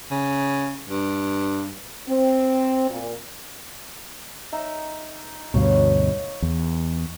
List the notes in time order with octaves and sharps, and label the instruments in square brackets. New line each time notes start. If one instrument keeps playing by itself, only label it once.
[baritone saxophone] C#3
G2
[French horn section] C4
A#2
[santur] D#4 E5
[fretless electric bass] D2 G2 B2 [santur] C#5 F5
[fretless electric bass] E2